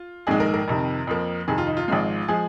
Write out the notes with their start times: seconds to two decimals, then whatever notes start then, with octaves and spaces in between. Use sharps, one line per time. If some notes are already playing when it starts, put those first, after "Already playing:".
Already playing: F4
0.27 A#1 G#2 D#3 G#3 G#4
0.40 A#4
0.54 A#4
0.68 F2 C3 D#3
1.07 F2 F3 A#3
1.48 F2 C3 D#3 G#4
1.58 F4
1.67 D#4
1.77 F4
1.88 G#1 G#2 F3 G#3
2.28 F3 G#3 G#4